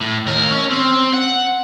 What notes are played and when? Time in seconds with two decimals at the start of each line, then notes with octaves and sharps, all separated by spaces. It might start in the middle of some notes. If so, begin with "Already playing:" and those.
0.01 A2
0.27 D#2 A#4
0.51 C#4
0.71 C4
1.14 F#5